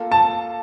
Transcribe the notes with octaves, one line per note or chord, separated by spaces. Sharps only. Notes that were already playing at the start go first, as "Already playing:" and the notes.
Already playing: A#3 F4 A4
A5